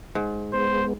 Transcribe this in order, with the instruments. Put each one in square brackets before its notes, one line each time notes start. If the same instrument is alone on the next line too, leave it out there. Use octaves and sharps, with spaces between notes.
[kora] G#2
[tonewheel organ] G#3 B3 [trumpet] C5